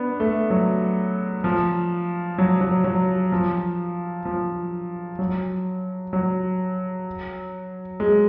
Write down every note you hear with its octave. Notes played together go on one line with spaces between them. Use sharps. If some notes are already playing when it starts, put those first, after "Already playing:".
Already playing: B3 D4
A3
F#3
F3
F#3
F#3
F#3
F3
F3
F#3
F#3
G#3